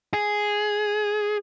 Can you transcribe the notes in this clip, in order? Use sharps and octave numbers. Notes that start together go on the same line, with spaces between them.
G#4